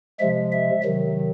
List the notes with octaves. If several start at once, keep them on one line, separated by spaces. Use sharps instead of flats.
C3 F3 G#3 E5
E5
C3 D#3 F#3